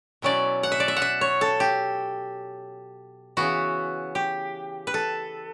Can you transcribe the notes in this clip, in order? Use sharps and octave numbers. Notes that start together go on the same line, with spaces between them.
B2 F#3 C#4 E4 D5
F#5
E5
D5
E5
F#5
E5
C#5
A4
G4
C#3 E3 B3 E4 F#4
G4
B4
A4